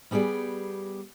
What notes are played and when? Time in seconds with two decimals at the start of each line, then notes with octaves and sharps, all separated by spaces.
0.11 G3 B3 G4 G#4 D5